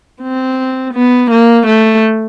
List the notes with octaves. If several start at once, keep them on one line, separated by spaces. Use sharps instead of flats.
C4
B3
A#3
A3